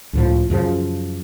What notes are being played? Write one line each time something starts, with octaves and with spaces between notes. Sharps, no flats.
C#2 A2 F3
F#2 C#3 F3